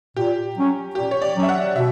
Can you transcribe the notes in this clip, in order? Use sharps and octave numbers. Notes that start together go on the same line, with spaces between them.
A#2 G4
F#3 C#4
A#2 G4
C#5
D5
F#3 C#4
E5
F#5
B2 E5